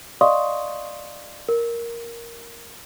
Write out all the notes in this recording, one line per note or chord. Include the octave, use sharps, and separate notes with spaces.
D5 D#5 F5 C6 C#6 D#6
A#4